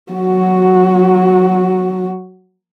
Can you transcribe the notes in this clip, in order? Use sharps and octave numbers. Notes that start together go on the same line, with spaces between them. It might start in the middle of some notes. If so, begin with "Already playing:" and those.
F#3 F#4